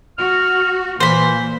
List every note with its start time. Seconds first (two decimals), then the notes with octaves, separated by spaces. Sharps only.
0.18 F#4 F6
1.00 A#2 E3 C5 B5